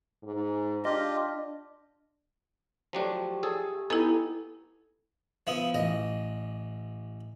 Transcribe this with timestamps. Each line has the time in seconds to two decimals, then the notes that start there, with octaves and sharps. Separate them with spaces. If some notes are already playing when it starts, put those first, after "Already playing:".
0.23 G#2
0.85 D4 F4 G4 D#5
2.93 F3 F#3 A3 D4 G4 A#5
3.43 G#4 A4
3.90 B3 D#4 E4 A4 G#5
5.47 F3 B3 E4 D#6
5.74 A1 D#5